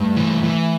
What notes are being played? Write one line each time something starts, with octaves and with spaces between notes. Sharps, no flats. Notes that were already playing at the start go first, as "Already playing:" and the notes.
Already playing: G2 A3
E3
E3